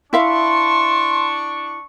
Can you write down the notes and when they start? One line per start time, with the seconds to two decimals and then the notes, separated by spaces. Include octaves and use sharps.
0.13 D4 E4 E5 F5 A5 C6 C#6